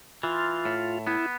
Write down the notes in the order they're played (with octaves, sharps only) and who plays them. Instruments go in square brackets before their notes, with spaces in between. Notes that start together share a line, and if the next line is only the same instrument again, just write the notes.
[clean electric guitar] E3 [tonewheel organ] F4
[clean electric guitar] A2
[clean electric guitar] B3 [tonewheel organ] E4